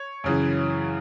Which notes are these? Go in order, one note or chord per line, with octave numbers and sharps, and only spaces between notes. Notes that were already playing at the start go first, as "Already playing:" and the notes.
Already playing: C#5
F#2 C#3 E3